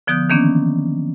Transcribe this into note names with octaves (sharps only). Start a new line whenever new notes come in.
D3 F3 B3 D#6 F#6 G6
D#3 E3 A#3 B3 C#4 D4